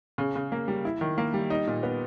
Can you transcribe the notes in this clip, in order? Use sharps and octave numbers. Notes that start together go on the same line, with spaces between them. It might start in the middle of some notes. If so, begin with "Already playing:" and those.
C#3
C#3
A#3
G3
E4
D#3
A#3
G3
D#4
A#2
B3